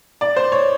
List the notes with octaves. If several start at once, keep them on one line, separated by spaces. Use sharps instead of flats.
D5
C5
C#5